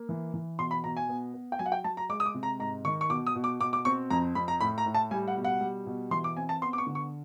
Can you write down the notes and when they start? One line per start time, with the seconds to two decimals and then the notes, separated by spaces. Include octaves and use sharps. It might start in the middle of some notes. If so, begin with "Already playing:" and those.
Already playing: A#3
0.09 E3
0.34 E3
0.59 B2 C6
0.71 B5
0.84 B2 A#5
0.97 G#5
1.09 B3
1.34 B3
1.52 G5
1.59 F#3 G#5
1.66 F#5
1.72 G5
1.84 F#3 A5
1.97 A#5
2.09 G#3 D6
2.20 D#6
2.26 D6
2.34 C3
2.43 A#5
2.59 G#2 A#5
2.85 D#3 C#6
3.01 C#6
3.10 B2 D6
3.27 D#6
3.35 B2
3.44 D6
3.60 B2 D6
3.73 D6
3.85 C4 C#6
4.10 F2 A#5
4.35 F2 B5
4.48 A#5
4.61 A2 B5
4.78 A#5
4.86 A2
4.94 A5
5.11 G3 G#5
5.28 F#5
5.37 B2
5.44 F#5
5.61 G3
5.86 B2
6.11 E3 C6
6.24 D6
6.36 C4 G#5
6.49 A5
6.62 B3 C6
6.73 D6
6.78 C#6
6.87 D3
6.95 C#6